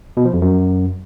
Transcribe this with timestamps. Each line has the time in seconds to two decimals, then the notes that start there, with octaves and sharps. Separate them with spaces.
0.17 B2
0.25 F3
0.33 F2
0.42 F#2